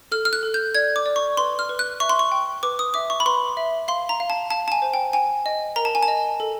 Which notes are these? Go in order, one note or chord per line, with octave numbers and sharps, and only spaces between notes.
A4 F6
F6
F#6
A4
G6
D5 G#6
D6
D5
C#6
B4 C6
F6
B4
F#6
E5 C#6
C6
C#6
G5
B4 D6
D#6
E5 D6
C#6
B5
B4 C6
E5
F5 C6
A#5
F5
A5
F5 A5
A5
G#5
C5
G5
G5 G#5
D#5
A#4 A#5
A5
G#5
A5
D#5
A4